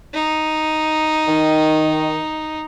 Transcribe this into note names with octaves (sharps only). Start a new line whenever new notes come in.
D#4
D#3